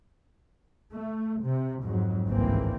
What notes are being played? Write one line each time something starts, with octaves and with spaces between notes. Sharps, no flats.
A3
C3
F2 G#2 F#3
G#1 C#2 G2 E3 A#3 C4